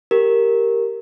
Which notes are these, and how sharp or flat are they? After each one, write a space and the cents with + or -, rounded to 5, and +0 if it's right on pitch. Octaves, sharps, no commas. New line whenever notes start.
G4 +0 A#4 -5